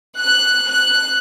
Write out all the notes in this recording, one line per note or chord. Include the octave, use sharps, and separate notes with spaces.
F#6
F#6